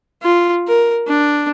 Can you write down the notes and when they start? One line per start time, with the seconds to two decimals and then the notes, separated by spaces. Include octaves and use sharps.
0.23 F4
0.67 A#4
1.08 D4